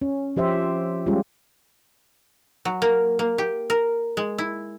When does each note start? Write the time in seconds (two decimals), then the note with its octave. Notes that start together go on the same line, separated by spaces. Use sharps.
0.02 C#4
0.36 F3 G4 C5 E5
1.06 G3 G#3 C#4 F4 G4
2.65 F#3
2.82 A#3
3.19 A#3
3.38 G4
3.70 A#4
4.17 G#3
4.38 E4